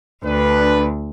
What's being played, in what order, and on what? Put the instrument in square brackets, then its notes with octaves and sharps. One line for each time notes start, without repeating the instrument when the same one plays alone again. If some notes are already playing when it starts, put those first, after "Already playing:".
[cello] D2 [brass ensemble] D4 B4